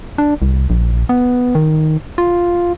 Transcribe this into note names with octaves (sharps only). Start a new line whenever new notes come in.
D4
C2
A#1
B3
D#3
F4